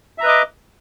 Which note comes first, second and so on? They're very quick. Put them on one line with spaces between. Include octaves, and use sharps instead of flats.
E5 A#5 B4 D#5 D6